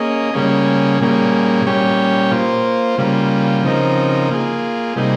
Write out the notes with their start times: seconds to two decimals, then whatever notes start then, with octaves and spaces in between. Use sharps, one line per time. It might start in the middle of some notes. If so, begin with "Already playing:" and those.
Already playing: A#3 C#4 G#4 D#5
0.34 C#3 G3 A#3 C#4 G#4
1.00 A#2 G3 A#3 C#4 G#4
1.65 A#2 G3 C#4 G4 C#5
2.31 A#3 F4 C5
2.98 C#3 G3 A#3 F4
3.63 C#3 F3 C4 D#4 A#4
4.30 A#3 F4 G#4
4.96 C3 G3 A#3 D#4 G#4